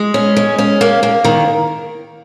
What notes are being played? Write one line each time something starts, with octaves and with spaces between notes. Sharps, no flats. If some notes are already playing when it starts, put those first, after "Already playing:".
Already playing: G#3
C#4
G#3
C#4
A#3
A#3
D#3